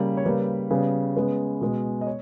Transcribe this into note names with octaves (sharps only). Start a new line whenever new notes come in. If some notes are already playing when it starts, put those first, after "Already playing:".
Already playing: C#3 G3 A#3
C#5
C#3 G3 A#3 B4
C#3 G3 B3
C#3 G#3 B3
B2 G#3 B3
D#5
C#5